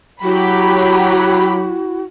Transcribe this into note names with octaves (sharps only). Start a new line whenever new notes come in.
F#3 E4 F#4 G4 B5